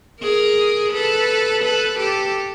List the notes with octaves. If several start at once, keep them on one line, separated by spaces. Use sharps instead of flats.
G#4 A#4
A4 B4
A4 B4
G4 A4